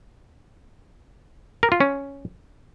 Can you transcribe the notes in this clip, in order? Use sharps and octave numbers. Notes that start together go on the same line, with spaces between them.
A#4
F4
C#4